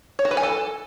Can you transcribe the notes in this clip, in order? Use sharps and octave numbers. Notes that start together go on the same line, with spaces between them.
C#5
F#4
B4
G#5
A4